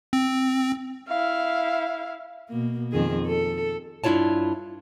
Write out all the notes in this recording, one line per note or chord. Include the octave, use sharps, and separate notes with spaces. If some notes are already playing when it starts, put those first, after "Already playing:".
C4
E4 F5
B2 A#3
F2 D#3 G#4
A4
G2 D4 E4 F4 C#5 A5